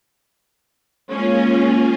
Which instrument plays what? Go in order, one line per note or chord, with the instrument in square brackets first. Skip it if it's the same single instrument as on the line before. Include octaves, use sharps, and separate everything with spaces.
[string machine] G#3 A#3 F4 [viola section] C#4